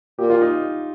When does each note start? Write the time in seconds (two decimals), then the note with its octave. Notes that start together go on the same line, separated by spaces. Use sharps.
0.18 A#2 G4
0.30 F4
0.41 D#4